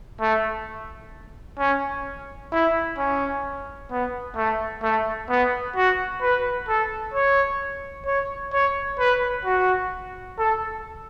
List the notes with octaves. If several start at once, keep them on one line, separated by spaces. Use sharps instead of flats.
A3
C#4
E4
C#4
B3
A3
A3
B3
F#4
B4
A4
C#5
C#5
C#5
B4
F#4
A4